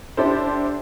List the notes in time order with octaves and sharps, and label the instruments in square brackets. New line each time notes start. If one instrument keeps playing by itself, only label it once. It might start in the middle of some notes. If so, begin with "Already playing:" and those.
[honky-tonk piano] D4 E4 G4 A4 C5